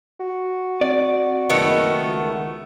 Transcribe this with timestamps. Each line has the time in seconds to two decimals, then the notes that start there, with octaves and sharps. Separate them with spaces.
0.20 F#4
0.81 C4 D5
1.50 F#1 D#3 A3 B3
2.00 C#2